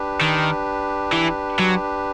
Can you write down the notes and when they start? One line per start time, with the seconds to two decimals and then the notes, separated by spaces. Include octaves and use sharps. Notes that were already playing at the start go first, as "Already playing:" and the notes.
Already playing: D4 G4 B4
0.21 D#3
1.13 E3
1.59 F#3